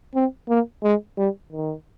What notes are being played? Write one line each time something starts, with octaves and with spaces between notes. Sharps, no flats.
C4
A#3
G#3
G3
D#3